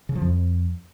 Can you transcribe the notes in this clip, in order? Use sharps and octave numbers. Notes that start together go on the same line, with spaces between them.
C#3
F3
F2